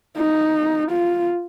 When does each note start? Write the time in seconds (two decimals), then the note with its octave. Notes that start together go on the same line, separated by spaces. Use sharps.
0.18 D#4
0.91 F4